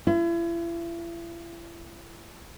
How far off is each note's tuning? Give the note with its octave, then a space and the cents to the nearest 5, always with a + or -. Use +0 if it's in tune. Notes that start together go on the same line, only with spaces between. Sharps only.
E4 +40